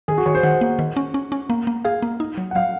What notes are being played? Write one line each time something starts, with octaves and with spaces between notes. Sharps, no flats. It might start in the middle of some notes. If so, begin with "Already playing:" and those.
D#3 G#4
F#4
D#3 C#5
C5
D#3 F#5
A#3
D#3
C#4
C#4
C#4
A#3
A#3
G#4 F5
A#3
D#4
F#3
F#5
F#3 F5